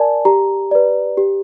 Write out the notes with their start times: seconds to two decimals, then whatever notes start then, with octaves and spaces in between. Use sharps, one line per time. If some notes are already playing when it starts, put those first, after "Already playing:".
Already playing: A#4 D5 G#5 A5
0.25 G4 A#5
0.71 B4 D5
1.18 G4